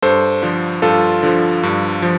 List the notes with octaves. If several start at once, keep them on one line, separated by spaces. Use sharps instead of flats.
G2 A4 C5
D3 F3
G2 F4 A4
D3 F3
G2
F3